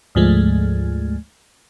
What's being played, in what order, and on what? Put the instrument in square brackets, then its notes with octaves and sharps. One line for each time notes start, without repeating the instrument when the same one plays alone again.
[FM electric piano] D2 G#2 F3 G#3 A3